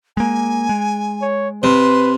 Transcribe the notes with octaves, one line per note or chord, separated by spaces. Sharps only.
G#3 A#3 G#5
G#3
C#5
C3 B4 C6